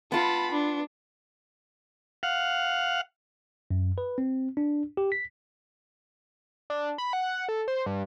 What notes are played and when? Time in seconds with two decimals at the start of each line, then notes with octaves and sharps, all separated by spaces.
0.12 B3 F4 A5 B5
0.52 D4
2.23 F5 F#5
3.71 F#2
3.98 B4
4.18 C4
4.57 D4
4.97 G4
5.12 B6
6.70 D4
6.98 B5
7.13 F#5
7.49 A4
7.68 C5
7.86 G2